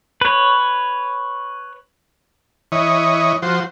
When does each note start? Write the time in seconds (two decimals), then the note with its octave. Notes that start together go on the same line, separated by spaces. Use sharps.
0.21 B4 C#5
2.72 E3 C#5 D#5
3.42 F3 F#4 C5